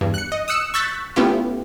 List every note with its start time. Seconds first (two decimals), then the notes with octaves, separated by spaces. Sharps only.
0.01 E2 G2
0.14 F#6 C#7
0.32 D#5
0.48 D#6 E6 F#6 C#7 E7
0.74 C#6 E6 F#6 G6 A6 B6
1.16 A3 B3 C#4 E4 F4 G4